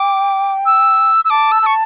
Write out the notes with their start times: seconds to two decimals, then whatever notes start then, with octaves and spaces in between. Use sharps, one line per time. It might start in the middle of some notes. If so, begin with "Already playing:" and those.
Already playing: G5 D6
0.66 E6
1.25 E6
1.30 A5 D6
1.52 E6
1.62 A5 C#6